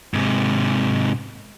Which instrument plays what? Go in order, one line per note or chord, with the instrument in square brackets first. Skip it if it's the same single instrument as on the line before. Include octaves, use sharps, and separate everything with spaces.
[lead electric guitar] G#2 C3